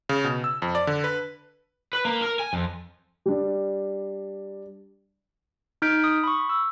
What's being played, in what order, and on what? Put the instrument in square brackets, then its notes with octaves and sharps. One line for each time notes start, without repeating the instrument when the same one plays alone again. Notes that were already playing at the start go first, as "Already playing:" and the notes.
[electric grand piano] C#3
B2
E6
F2
D5
D3
B4
[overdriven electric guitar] B4
A#3
A#4
G#5
F2
[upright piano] G3 D4
[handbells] D#4 F6 G6 B6 D7
D#6
B5 C#6
E6